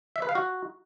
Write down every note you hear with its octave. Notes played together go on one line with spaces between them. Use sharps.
E5
B4
F5
F#4